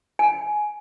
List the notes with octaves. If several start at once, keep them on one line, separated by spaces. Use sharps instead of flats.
G#5